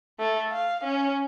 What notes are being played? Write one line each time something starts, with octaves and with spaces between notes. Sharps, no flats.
A3
F5
C#4